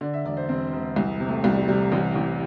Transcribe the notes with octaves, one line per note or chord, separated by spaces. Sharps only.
D3 D5
E5
E1 D5
C5
E1 C4
E1
C2
C3
A3
C2 G3
G3
C3 G3
A1 G3
A1